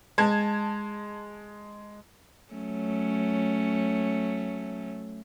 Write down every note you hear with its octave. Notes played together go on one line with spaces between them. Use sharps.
G#3 A5 G#6
F#3 A3 C#4